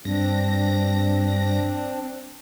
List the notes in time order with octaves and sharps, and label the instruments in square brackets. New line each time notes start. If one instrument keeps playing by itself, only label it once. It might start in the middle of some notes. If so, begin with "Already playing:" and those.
[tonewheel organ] G2 A#6 [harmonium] C4 D4